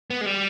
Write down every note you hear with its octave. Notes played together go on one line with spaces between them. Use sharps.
B3
G#3
G3